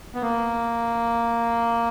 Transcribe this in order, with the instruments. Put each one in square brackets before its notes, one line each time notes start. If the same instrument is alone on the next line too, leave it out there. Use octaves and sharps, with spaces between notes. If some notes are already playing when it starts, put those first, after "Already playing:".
[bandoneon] B3
A#3